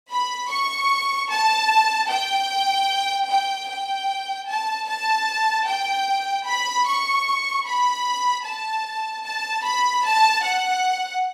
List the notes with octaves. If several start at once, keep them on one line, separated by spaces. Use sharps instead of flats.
B5
C#6
A5
G5
G5
G5
A5
A5
G5
B5
C#6
B5
A5
A5
B5
A5
F#5